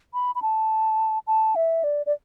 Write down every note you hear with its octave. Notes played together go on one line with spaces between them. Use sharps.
B5
B5
A5
A5
E5
D5
D5